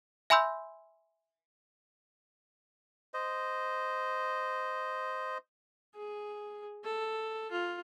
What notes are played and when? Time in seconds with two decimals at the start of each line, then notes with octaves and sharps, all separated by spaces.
0.30 E5 G#5 B5 C6 E6 G6
3.14 C5 D#5
5.95 G#4
6.84 A4
7.51 F4